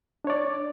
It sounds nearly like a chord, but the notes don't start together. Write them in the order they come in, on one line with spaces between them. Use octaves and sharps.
D4 C#5 D5